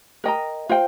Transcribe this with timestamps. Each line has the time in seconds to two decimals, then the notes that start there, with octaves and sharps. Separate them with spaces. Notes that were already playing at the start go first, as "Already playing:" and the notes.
0.24 A#4 D#5 G5 A#5
0.69 F4 C5 G5